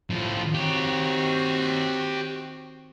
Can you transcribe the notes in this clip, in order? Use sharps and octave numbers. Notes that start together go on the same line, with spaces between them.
A2 F3 F4
D#3 C4 F#4 G4 C#5